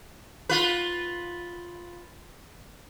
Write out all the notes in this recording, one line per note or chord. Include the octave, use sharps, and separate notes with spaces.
F4 B4